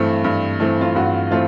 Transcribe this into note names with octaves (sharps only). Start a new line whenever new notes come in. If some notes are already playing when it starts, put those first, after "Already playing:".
Already playing: G2 E3 A3 C4
G2
E3 A3 C4
F4
G2 F#4
E3 A3 C4 F4